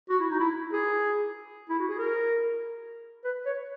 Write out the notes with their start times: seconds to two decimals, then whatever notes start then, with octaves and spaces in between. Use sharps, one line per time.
0.09 F#4
0.19 E4
0.30 D#4
0.39 E4
0.73 G#4
1.69 E4
1.79 F#4
1.89 G#4
1.98 A#4
3.24 B4
3.45 C#5